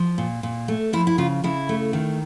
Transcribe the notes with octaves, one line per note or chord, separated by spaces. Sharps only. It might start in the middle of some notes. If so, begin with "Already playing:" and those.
Already playing: F3
A#2
A#2
A3
F3 E4
E4
C#3 F4
C#3 E4
A3
D#3